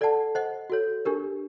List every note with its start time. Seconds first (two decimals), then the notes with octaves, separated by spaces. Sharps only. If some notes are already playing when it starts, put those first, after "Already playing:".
0.01 A4 D5 F#5 A5
0.35 C5 D#5 F#5
0.70 F#4 A4 C#5
1.05 D4 G4 A#4